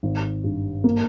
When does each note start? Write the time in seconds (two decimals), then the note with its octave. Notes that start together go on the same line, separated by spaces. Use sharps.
0.03 G#1
0.44 G2
0.84 A#3